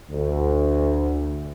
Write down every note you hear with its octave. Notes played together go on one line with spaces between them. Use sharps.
D2